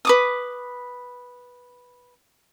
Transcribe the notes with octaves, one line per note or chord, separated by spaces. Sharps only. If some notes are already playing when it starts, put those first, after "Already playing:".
B4 D6 D#6